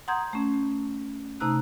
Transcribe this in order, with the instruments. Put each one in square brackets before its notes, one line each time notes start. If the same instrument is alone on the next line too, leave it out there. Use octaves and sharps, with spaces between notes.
[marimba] F#5 A#5 C6 D#6 G6 G#6
A3 C#4
C3 A3 D#4 A#5 E6 F#6